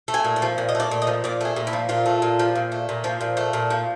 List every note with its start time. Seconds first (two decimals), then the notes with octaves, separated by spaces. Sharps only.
0.08 A3
0.14 G#5
0.25 A#2
0.36 D5
0.42 F3
0.58 A#2
0.69 D#5
0.75 A3 D5
0.91 A#2
1.02 D#5
1.07 F3
1.24 A#2 D5
1.41 A3 G#4
1.56 A#2
1.67 E4
1.73 F3
1.89 A#2 F4
2.06 A3
2.22 A#2
2.39 F3
2.56 A#2
2.72 A3
2.89 A#2
3.04 F3
3.21 A#2
3.37 A3
3.53 A#2
3.70 F3